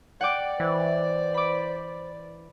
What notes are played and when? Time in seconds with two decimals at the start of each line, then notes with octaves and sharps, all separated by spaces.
0.21 D5 F#5 G5 D6
0.60 E3 C5
1.34 B5 D6